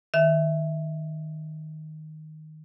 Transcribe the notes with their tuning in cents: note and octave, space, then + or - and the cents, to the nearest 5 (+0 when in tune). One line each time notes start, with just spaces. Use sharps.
D#3 +0 E5 +0